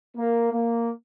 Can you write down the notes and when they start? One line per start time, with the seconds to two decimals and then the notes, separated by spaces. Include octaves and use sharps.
0.17 A#3
0.53 A#3